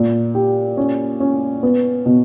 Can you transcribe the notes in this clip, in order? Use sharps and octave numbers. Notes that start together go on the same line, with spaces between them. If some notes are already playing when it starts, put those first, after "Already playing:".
Already playing: A#2
G4
C#4
C#4
B3
B2